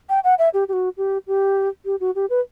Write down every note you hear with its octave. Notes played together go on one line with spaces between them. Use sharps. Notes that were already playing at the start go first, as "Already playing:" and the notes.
G5
F#5
E5
G4
G4
F#4
G4
G4
G4
F#4
G4
B4